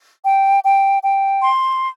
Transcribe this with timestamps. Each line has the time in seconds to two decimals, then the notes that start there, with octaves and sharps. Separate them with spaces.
0.23 G5
0.63 G5
1.02 G5
1.42 C6